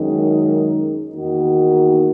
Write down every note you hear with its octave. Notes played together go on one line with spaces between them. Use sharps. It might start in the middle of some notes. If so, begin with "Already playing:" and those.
Already playing: F#2 D#3 G#3 D#4
E2 D#3 A#3 D#4 F#4